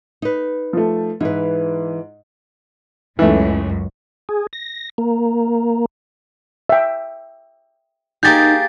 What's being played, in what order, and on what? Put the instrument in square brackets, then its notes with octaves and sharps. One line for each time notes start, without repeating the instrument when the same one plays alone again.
[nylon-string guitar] D#4 B4
[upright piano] F3 A3
[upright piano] G#2 [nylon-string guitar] E3 B4
[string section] C#2 F#2 [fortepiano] E3 A3
[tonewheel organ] G#4
A#6
A#3
[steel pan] E5 G5
[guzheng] A#3 G4 G#4 [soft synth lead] D#4 [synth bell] G6 A6